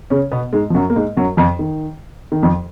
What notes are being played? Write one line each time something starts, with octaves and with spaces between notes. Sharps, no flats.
C#3 C#4
B2 B3
G#2 G#3
F3
F#2 F#3
A#3
G#2 G#3
F#2 F#3
F2 F3
D#3
D#3
F2 F3